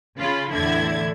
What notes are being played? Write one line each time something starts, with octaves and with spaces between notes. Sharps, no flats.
C#3 F4 B5
E2 A2 D3 E4 G#6